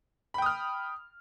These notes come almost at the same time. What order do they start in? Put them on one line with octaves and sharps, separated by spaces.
B5 G5 D#6 F6